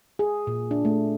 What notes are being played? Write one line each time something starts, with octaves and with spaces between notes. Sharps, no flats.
G#4
A#2
D4
A3